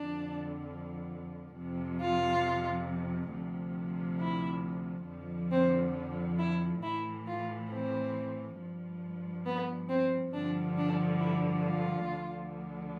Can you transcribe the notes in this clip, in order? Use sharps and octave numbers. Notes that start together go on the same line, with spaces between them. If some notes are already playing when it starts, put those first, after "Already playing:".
Already playing: F2 D3 F3 D4
F2 C3 F3
F4
D2 C3 F3
E4
F2 D3 F3
C4
E4
A2 E3 E4
F4
C4
G2 F3
B3
C4
G2 D3 F3 D4
D4
E4
F4
D2 D3 F3